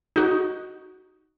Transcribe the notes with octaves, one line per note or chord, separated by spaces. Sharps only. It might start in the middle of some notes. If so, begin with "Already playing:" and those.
D#4 F#4